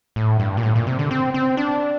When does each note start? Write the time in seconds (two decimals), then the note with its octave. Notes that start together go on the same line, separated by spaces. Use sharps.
0.16 A2
0.39 G2
0.57 A#2
0.63 A2
0.75 A#2
0.87 C3
0.99 D3
1.11 C4
1.34 C4
1.57 D4